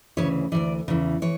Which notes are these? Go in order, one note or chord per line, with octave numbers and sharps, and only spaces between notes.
D2 C#3 E3 C#5
D2 C#3 E3 D5
E2 C#3 E3
E3 C#5